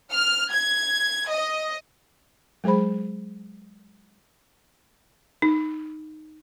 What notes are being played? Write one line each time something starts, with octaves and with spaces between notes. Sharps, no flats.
F6
G#6
D#5
F#3 G#3 G#4 C5 B5
D#4